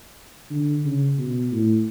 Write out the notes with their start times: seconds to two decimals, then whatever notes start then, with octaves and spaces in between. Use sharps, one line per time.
0.50 D3
0.84 C#3
1.18 B2
1.51 A2